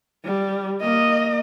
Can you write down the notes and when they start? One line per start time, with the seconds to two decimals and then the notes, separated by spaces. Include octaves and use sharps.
0.25 G3
0.81 A#3 D#5